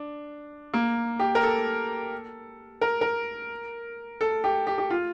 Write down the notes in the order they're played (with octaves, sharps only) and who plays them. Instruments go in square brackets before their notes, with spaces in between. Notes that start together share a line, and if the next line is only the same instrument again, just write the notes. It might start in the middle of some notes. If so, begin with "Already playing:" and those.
Already playing: [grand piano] D4
A#3
G4
A#4
A4
A#4
A#4
A4
G4
G4
G4
F4